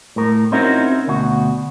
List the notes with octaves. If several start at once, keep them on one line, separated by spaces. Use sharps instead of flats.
A2 A#4
C4 C#4 D#4 E4 F#4 A#4
D2 B2 F#4